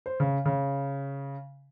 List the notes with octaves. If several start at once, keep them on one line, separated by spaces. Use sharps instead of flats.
C5
C#3
C#3